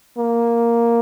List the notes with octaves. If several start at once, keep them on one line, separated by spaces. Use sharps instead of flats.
A#3